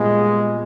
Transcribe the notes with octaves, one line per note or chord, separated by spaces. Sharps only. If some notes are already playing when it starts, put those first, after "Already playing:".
Already playing: A#2 G3 G#3 B3